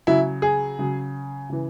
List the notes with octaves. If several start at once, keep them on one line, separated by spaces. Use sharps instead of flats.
C#3 F#3 E4
G#4
C#3 F#3
C#3 E3